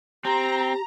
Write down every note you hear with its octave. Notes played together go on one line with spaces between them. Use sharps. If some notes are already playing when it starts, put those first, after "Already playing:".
C4 G4 A#5